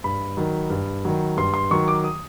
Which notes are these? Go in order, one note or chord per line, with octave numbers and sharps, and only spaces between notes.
G2 B5
D#3 F#3
G2
D#3 F#3
G2 C6
C6
D#3 F#3 C#6
D6
D#6